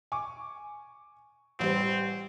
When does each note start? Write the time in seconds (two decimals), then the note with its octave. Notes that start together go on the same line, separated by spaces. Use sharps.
0.12 G#5 C#6 D6
1.60 A1 G3 C4 C5